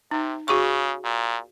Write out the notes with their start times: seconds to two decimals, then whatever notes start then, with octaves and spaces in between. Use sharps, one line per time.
0.11 C3 D#4
0.48 C#3 F#4 G#4 C#6
1.04 A#2